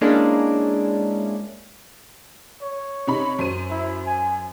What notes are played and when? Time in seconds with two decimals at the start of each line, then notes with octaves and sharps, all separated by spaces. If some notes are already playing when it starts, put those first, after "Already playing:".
0.01 G#3 A#3 C#4 D4 E4
2.62 C#5
3.07 C3 D#4 B5
3.39 F#2 C5 D#7
3.70 E4
4.06 G#5